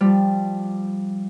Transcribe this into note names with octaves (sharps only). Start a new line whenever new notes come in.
F3 G3